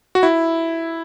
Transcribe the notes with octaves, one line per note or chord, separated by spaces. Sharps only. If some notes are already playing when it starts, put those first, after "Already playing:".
F#4
E4